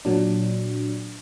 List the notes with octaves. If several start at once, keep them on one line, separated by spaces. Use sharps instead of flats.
A#2 F#3 D4